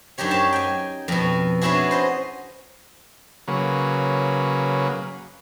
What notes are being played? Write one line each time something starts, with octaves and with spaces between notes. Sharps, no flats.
F#2 D4 D#4 G4 C#5
C#5 A5
G5 G#5
F2 B2
B3 C#4 D4 E4 F#4 G#4
C5 D#5
C#3 F#3 A#3 B4